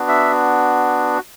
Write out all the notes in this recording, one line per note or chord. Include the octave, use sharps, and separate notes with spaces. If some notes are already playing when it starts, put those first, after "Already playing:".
Already playing: B3 D4 F#4
E5